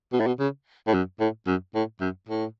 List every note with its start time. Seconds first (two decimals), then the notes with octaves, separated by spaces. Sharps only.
0.13 B2
0.20 A2
0.27 B2
0.40 C#3
0.87 A2
0.94 F#2
1.20 A2
1.47 F#2
1.75 A2
2.01 F#2
2.28 A2